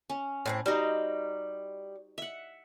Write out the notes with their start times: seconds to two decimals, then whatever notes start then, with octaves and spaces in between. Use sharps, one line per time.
0.10 C#4
0.46 A2 A3 C4
0.66 G3 D#4 F#4 C5
2.18 E5 F#5